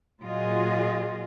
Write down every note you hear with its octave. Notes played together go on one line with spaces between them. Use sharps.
A#2 F#3 F4 F#4 G#4 D#5